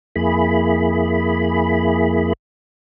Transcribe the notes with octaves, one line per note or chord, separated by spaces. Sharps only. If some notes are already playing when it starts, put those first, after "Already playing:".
F2 A#3 E4 G#4 B5